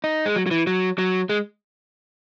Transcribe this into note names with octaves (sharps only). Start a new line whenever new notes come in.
D#4
G#3
F#3
F#3
E3
F#3
F#3
G#3